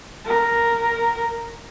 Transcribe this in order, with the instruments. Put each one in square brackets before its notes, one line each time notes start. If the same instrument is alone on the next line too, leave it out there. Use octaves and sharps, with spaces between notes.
[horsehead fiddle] A#4